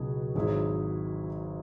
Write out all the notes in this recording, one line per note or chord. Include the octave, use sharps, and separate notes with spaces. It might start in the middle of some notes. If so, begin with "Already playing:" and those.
Already playing: C#2 B2 F#3 E4 G#4
G#1 G#2 F#3 E4 G#4